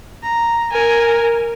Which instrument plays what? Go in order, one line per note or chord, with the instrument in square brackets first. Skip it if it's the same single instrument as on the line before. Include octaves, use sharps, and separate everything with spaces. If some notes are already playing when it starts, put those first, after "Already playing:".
[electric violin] A#5
[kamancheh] A#4 [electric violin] G#5